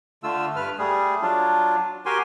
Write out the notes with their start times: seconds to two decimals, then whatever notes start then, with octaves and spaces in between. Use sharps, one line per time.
0.23 D3 A3 F4 E6
0.56 G2 B4 F6
0.78 G3 A3 G#4
1.22 F#3 D4 F4
2.06 F#4 G4 A#4 G5 G#5 C6